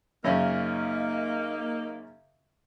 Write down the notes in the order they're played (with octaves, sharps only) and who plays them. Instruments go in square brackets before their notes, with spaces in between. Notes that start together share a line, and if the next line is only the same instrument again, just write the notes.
[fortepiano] F#2 C#3 C#4 [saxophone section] A#3 D#4